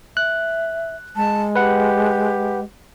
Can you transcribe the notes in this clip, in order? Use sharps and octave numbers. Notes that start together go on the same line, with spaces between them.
E5 F#6
G#3 A5
G4 B4 F#5